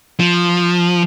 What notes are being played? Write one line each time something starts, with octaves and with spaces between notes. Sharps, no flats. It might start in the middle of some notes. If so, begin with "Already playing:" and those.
F3